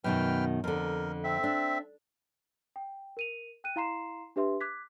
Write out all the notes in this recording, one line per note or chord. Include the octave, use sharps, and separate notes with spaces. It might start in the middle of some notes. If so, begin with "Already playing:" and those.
F#2 B2 D#3 B4 G5 F6
F2 D3 A#4
C4 E5
D4
G5
A#4 D#7 F7
G5 F#6 D#7
E4 F5 A#5 C6 C7 E7
D4 G4 B4 E5 C6
D6 F#6 G#6 B6